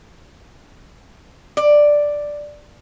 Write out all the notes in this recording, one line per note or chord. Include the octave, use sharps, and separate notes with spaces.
D5